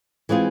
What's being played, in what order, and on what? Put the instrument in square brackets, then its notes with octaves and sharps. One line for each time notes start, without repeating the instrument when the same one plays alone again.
[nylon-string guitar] E3 G#3 C4 F4 G#4